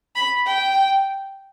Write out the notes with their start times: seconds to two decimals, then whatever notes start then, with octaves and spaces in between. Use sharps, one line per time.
0.16 B5
0.46 G5